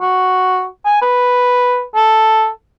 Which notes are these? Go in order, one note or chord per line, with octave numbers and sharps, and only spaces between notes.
F#4
G#5
B4
A4